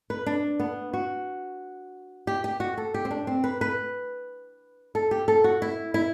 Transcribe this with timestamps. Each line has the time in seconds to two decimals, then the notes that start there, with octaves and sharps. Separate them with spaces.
0.10 B4
0.26 D4
0.60 B3
0.93 F#4
2.27 G4
2.44 G4
2.60 F#4
2.78 A4
2.94 G4
3.05 C4
3.11 D4
3.27 C4
3.44 B4
3.61 B4
4.95 A4
5.11 G4
5.28 A4
5.44 F#4
5.62 E4
5.94 E4